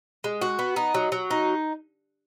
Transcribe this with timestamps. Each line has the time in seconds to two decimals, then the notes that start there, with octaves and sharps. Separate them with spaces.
0.24 G#3
0.42 F#4
0.59 B3
0.76 D#4
0.94 F#3
1.12 F#3
1.31 D#4